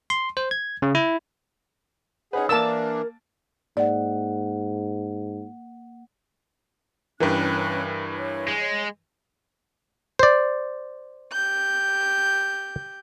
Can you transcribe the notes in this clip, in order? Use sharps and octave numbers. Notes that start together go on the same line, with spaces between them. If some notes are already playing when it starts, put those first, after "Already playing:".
C6
C5
G#6
C#3
E4
C#4 D#4 G#4 B4 F#5
E3 A#3 D4 A#4 A5 E6 A6
G#2 A#3 D5 F#5
G2 E3 C#4 A#4 B4 G5 F#6
C#5
G#3
C5 D5
G4 G6